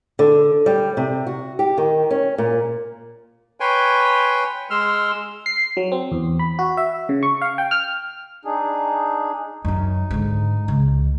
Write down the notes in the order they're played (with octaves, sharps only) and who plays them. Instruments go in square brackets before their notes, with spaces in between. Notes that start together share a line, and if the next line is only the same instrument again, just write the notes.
[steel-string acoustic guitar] D3
G3
C3
F#4
G4
D#3
C#4
A#2
[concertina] B4 C#5 G5 G#5 C6
G#3 C6 E6 F6
[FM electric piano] C7
F#3
C4
E2
B5
F#4
E5
C#3
C#6
F5
G5
F6
[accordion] D4 D#4 G#4
[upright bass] F#2 F#3 [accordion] D#4
[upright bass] G#2 D3
C#2